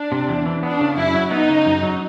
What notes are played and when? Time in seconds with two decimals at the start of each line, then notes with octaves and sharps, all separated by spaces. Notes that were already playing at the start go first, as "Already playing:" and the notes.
Already playing: D4
0.12 C3
0.29 E2
0.46 E3
0.63 B3 D4
0.81 C#3
0.97 F#2 E4
1.15 F#3
1.31 B3 D#4
1.49 C#3
1.66 F#2
1.83 F#3